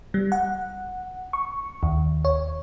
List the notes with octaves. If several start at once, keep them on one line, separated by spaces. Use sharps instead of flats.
G3
F#5
C#6
D#2
C#5